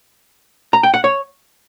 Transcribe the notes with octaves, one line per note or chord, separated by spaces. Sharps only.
A#5
G5
F#5
C#5